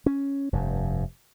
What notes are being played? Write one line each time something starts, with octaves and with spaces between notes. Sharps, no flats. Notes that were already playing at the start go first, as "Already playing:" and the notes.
C#4
F1 G2